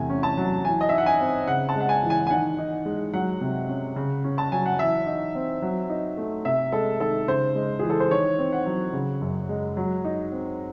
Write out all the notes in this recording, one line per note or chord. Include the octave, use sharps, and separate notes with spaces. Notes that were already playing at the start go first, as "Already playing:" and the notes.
Already playing: E2 C3 A3 G#5
C#4
A5
F#3
E3 G#5
D#5
D#4 E5
F#5
G#5
C4
C#3 F#5
A5
G#3 F#5
G#5
E3
G#5
G#5
D#3 F#5
D#4
G#3
F#3 F#5
C3
C#4
C#3
C#4
A5
F#3 G#5
F#5
E3 E5
D#4
C4
F#3
D#4
A3
C3 E5
G#3 A4
D#3 A4
C#3 C5
G#3
E3 G#4
A4
C5
D#3 C#5
C4
F#5
F#3
C#3
F#2
G#3
F#3
D#4
C4